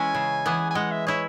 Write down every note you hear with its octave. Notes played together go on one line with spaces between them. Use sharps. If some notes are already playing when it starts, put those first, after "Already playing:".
Already playing: E3 G#3 C#4 E4 G#5
C#3
E3 B3 G#4
G#5
G#3 F#5
E5
E4 G#4 C#5